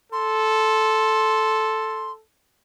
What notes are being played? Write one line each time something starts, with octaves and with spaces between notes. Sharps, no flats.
A4 C6